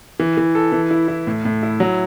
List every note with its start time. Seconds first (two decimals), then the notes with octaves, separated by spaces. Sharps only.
0.20 E3
0.38 E3
0.55 A4
0.72 E3
0.91 E4
1.08 E4
1.27 A2
1.45 A2
1.63 E4
1.80 F#3